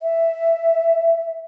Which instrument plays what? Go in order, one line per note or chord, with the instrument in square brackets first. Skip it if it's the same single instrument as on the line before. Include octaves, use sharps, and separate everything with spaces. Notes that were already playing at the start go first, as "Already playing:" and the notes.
[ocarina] E5